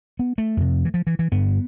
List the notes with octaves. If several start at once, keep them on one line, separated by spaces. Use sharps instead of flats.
B3
A3
F2 C3
E3
F3
E3
E3
G2 D3 B3